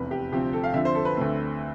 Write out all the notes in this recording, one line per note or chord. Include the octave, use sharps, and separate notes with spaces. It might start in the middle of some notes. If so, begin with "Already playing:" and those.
Already playing: F1 E2 C3 B4
G4
D2 C3 F3 C4 G4
A4
F5
F2 D3 F3 E5
C5
A4
B4
D2 D3 A3 C4